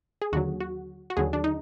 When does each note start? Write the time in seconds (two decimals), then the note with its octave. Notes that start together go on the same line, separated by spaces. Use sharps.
0.22 G#4
0.33 D#2 D3 F#3 F#4
0.61 F#4
1.10 F#4
1.17 D#2 D3 F#3 G#4
1.33 D4
1.44 D#4